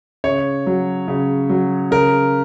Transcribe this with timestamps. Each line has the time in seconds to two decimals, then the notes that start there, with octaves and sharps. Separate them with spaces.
0.24 C#3 C#5
0.67 F#3
1.08 C#3
1.50 F#3
1.91 C#3 A#4